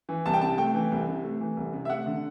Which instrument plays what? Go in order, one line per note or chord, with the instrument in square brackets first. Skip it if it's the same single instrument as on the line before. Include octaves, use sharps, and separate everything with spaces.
[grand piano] E3
C2 A5
G5
C3 A5
A3 G5
E3
C2
C3
A3
E3
C2
C3
E5
A3 F#5
D3